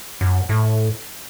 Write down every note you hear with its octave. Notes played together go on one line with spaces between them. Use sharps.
F#2
A2